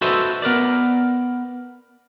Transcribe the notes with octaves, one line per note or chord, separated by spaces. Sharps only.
F#4 A4 B4 C5 D#5 E5
B3 A#4 B4 D5